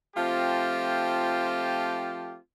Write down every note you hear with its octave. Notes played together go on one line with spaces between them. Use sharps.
F3 A3 C4 F4 G4 A5